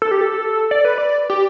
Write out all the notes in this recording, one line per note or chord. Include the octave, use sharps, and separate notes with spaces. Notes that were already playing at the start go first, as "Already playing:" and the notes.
A4
G4
A4
D5
B4
D5
G4